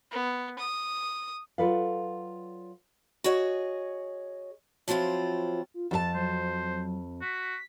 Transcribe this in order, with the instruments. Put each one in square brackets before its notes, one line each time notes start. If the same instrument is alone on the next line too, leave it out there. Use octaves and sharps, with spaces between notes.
[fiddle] B3
D#6
[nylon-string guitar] F#3 F4 A4 B4 D5 F5
[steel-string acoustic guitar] F#4 G#4 C#5 D#5
F3 F#3 C4 E4 F4
[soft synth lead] F4
[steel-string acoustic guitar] F2 F#4 A5 [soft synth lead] A6
[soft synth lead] F#3 [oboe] C5
[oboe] F#4 [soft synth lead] B6